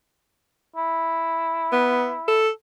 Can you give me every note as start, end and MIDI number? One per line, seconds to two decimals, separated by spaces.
0.76 2.44 64
1.72 2.14 59
2.28 2.50 69